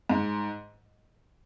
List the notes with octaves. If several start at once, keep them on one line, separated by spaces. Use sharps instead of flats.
G#2